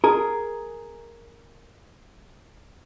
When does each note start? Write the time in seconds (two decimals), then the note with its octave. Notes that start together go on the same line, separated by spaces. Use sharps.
0.04 G#4 A#4